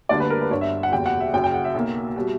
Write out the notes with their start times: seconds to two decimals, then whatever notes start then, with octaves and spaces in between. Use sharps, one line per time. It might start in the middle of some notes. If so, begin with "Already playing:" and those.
0.09 D2 D3 G3 A#3 D5
0.20 B4
0.30 A#4
0.41 B4
0.51 G1 G2 D3 C#5
0.61 E5
0.83 F#5
0.92 F#1 E2 B2 G3 G5
1.06 F#5
1.20 E5
1.33 F#1 F#2 C#3 G5
1.44 G5
1.54 F#5
1.64 E5
1.75 B1 B2 A#3
2.16 B2 G3